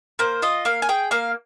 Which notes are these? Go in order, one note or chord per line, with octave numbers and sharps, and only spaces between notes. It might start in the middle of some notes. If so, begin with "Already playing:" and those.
A#3 C5
F4 D#5
A#3 F5
G#5
G#4 G5
A#3 F5